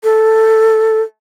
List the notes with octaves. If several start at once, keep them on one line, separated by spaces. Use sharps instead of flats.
A4